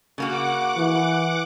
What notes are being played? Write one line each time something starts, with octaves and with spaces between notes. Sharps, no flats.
C#3 A#3 F#4 F#5 D6
E3